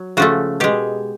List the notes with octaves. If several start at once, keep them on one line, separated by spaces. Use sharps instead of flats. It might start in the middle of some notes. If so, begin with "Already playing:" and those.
Already playing: F#3
C#3 F3 A3 F#4
B2 G#3 G4